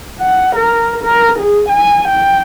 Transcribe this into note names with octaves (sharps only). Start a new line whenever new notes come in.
F#5
A#4
A#4
G#4
G#5
G5